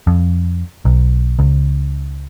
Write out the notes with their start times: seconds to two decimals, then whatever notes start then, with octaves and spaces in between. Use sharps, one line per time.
0.07 F2
0.85 B1
1.39 C#2